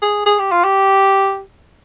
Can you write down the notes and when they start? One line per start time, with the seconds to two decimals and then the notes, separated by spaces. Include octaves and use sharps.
0.02 G#4
0.26 G#4
0.39 G4
0.52 F4
0.64 G4